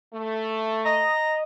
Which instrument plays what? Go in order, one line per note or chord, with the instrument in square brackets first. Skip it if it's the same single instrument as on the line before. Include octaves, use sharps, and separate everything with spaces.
[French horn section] A3
[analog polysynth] D#5 [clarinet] A#5